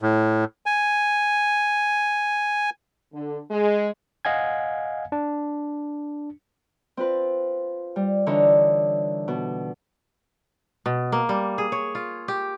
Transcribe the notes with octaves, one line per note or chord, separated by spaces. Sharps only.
A2
G#5
D3
G#3
D#5 F5 F#5 G#5 G#6
D4
C4 F4 B4
G3
D3 E3 D#4 C#5
B2
B2
A#3
G3
G#4
C#5
F4
G4